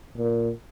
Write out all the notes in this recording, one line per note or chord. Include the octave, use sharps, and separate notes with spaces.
A#2